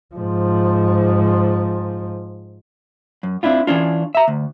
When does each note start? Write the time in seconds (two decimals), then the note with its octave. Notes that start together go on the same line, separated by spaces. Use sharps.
0.15 G#2 F3
3.23 F#2
3.43 C4 D4 E4 F4
3.67 E3 C#4 D4 F4
4.15 E5 A#5
4.28 D2